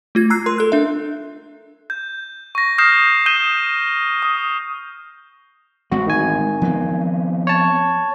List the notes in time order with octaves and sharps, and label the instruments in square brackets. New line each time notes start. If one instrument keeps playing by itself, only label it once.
[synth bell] A3 F4 G#6
A#5 E6 F#6 C7
A#4 C6
A4 F#6
D4 E5
[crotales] G6
C#6 A#6
D#6 F6 G6 A#6 C7 E7
D#6 G6 D#7 E7 G7
D#6
[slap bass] A1 G#3 C4 [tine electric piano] F#4
[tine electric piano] D#3 G#5
[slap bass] F3 B3 C4
[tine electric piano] C#5 A5